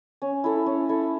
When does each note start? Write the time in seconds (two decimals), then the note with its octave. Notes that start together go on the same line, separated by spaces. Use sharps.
0.22 C#4
0.44 E4 A4
0.66 C#4
0.89 E4 A4